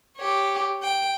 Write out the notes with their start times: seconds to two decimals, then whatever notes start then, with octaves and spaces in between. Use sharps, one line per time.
0.17 G4 C#5
0.82 G5